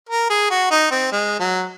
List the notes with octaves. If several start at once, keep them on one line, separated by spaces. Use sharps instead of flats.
A#4
G#4
F#4
D#4
C4
G#3
F#3